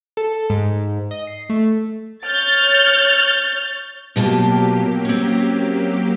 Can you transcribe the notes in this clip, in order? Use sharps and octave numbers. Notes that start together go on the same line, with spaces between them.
A4
G#2
D#5
C7
A3
C#5 F6 G6 A6
B2 F#3 A#3 F4 G4 A5
C4 C#4